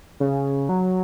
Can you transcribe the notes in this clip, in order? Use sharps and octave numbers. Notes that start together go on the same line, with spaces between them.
C#3
F#3